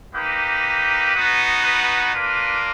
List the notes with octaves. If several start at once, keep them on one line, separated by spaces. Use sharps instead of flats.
A#3 D#4 G4 B4
B3 D#4 F#4
B4
A#3 D4 F4 B4